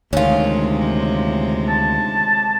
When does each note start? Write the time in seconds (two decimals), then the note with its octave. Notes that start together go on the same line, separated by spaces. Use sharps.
0.13 D2 C3 D#3 G#3 C#4 F4
1.69 A5